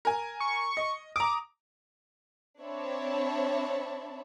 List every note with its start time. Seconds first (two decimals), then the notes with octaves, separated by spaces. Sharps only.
0.05 A#4 G#5
0.40 C#6
0.77 D#5
1.16 A#5 D6 D#6
2.61 C4 D4 C#5 E5 A5 B5